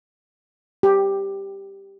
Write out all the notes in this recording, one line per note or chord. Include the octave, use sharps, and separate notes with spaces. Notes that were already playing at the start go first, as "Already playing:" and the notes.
G4